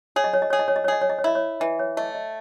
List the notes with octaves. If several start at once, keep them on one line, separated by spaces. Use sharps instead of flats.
G#4 C#5
D#5
C#5
D#5
G#4 C#5
D#5
C#5
D#5
C#5
G#4 D#5
C#5
D#5
C#5
E4 D#5
C#5
E3 D#5
C#5
A3 D#5
D#5